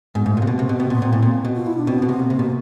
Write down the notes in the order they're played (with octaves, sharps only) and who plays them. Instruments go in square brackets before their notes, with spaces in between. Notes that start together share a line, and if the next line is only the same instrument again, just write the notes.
[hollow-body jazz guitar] G#2 [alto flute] B3
[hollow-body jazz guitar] G#2 [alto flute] A3
[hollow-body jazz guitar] A#2 [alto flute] A#3
[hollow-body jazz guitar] C3
B2
[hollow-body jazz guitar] C3 [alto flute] A#3
[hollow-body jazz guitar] B2 [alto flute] B3
[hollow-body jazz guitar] B2 [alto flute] C4
[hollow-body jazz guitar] A#2 [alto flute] B3
[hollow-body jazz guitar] A#2 [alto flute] C4
[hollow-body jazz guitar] A2
A#2
B2
[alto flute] F4
E4
D4
[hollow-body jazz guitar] B2 [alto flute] C4
[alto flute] B3
[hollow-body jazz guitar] B2
[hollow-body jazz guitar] C3 [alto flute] B3
[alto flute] A#3
[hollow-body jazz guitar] C3 [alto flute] A#3
[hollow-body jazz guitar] B2